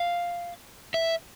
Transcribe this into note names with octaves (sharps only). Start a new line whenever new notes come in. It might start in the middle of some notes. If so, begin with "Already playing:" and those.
Already playing: F5
E5